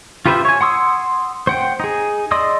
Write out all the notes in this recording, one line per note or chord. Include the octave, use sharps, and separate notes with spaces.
F4 G4 B4 C5 E5
C#5 G#5
F#5 C6 D#6 E6
C5 F#5 G5
D#4 G#4
D5 D#5 C6 D#6 E6